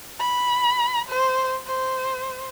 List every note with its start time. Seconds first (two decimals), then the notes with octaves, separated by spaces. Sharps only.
0.19 B5
1.09 C5
1.67 C5